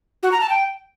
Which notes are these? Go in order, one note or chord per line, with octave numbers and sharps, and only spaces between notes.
F#4
A#5
A5
G5